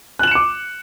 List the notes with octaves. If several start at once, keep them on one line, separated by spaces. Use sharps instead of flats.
D6 F#6 C#7 E7 F#7